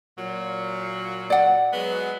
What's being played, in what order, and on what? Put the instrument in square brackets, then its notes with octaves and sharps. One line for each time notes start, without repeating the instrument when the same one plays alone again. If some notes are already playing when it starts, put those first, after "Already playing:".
[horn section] A#2 F#3
[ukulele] D5 F#5
[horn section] F#3 G#3 B3